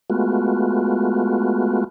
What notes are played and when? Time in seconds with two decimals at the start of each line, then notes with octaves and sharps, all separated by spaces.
0.10 G#3 A3 B3 F4 F#4